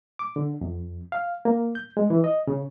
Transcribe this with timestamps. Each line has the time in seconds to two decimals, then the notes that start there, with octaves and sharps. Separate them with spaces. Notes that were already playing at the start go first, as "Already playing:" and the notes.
0.19 D6
0.36 D3
0.61 F2
1.12 F5
1.45 A#3
1.75 G6
1.97 G#3
2.10 E3
2.24 D#5
2.47 C#3